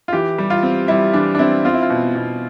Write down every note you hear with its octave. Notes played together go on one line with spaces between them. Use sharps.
F4
E3 G4
G3
F4
C4
G3 E4
E3 D4
D4
C4 E4
C4 F4
E4
F4
B2
B2